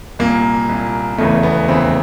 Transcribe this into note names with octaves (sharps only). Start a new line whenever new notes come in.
C2 A#2 A#3
C2 A#2
F1 E2 C#3 E3 A3
B3
F1 E2 C#3 E3 C4